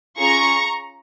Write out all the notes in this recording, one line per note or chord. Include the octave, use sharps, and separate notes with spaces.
C#4 F4 G#4 A#5 C#6